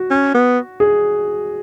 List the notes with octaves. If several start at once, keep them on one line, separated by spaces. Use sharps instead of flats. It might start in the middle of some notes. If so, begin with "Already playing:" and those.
Already playing: F#4
C#4
B3
G#4